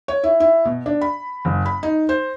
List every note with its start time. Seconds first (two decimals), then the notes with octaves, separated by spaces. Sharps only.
0.08 C#5
0.23 E4
0.40 E4
0.65 B2
0.86 D4
1.02 B5
1.45 F#1
1.66 B5
1.83 D#4
2.09 C5